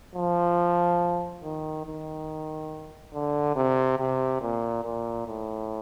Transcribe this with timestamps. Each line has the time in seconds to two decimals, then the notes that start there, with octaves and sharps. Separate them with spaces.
0.15 F3
1.43 D#3
1.86 D#3
3.13 D3
3.56 C3
3.98 C3
4.41 A#2
4.84 A#2
5.27 A2